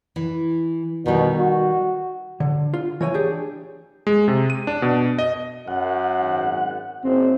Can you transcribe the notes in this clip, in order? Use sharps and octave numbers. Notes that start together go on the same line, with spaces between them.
E3
B2 D#3 G3
F#4
D3
F4
E3 C#5 G5 G#5
D4 G4 G#4
G#3
C3
D#7
D4
B2
D#5
F#2 F#5
G#1
F#1 C4